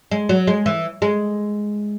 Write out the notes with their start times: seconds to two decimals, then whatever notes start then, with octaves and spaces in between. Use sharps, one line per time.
0.11 G#3
0.29 F#3
0.47 G#3
0.66 E3
1.02 G#3